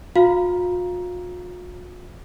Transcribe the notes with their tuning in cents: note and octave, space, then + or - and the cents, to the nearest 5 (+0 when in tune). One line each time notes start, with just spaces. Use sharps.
F4 +45 F5 -5 A#5 +10